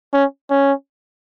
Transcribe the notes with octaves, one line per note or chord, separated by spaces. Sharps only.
C#4
C#4